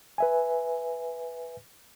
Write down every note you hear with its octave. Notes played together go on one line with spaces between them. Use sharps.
B4 E5 G#5